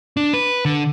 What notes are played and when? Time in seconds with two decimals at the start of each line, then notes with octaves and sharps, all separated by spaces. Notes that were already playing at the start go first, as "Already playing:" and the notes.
0.17 D4
0.33 B4
0.65 D3